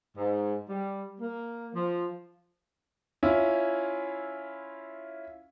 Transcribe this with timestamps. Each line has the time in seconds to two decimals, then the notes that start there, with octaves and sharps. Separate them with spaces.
0.17 G#2
0.69 G3
1.20 A#3
1.74 F3
3.23 C#4 E4 F4